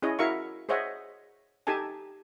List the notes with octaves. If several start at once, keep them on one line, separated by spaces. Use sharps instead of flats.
C#4 E4 G#4 C#5 D#5
E4 F#4 A#4 E5 F5 C#6
G#4 C5 C#5 D#5 E5 F#5
D#4 G4 A4 G#5 A5